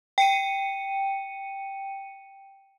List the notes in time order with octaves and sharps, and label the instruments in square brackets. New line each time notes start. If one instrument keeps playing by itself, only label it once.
[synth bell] G5 C#7 D#7